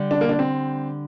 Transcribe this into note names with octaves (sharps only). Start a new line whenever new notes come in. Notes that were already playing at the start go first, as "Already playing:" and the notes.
Already playing: D3 G3
D4
A#3
D4
C4